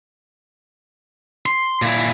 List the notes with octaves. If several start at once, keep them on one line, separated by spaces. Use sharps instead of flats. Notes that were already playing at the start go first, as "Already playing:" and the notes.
C6
A#2 E4